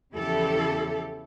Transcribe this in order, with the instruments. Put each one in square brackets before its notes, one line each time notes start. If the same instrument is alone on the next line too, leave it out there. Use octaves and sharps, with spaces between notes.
[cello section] E2 C#3 F3 E4 G4 A4